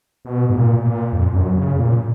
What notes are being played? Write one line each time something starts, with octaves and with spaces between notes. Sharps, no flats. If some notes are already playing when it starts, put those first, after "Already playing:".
B2
G#2
A#2
A#2
F2
F#2
C#3
A#2